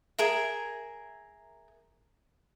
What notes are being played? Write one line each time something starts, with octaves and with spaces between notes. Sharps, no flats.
G#4 A#4 E5